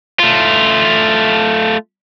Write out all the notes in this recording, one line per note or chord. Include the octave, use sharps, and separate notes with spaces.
A3 F4